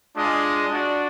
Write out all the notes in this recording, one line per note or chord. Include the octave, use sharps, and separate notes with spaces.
G#3 D4 F4 G#4 D#5
D4 F#4 D5